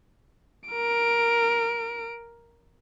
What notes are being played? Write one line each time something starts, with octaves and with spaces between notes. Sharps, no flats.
A#4 D7